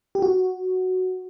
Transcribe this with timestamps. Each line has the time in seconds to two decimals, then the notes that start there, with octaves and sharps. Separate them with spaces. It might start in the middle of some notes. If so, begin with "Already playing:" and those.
0.15 G4
0.22 F#4